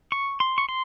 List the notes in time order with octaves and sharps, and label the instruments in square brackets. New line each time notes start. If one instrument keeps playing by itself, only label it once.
[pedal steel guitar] C#6
C6
C#6
C6